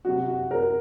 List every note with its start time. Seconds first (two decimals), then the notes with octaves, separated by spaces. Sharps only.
0.05 C3 F#3 F#4
0.28 F#4
0.51 A#4